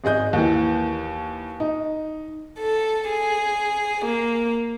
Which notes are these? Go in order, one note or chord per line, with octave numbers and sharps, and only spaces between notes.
G#1 G#4 D#5 G6
D#2 E3
D#4
A4
G#4
A#3